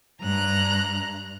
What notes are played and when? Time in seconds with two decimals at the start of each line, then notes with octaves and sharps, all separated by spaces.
0.21 G2 A#5 F#6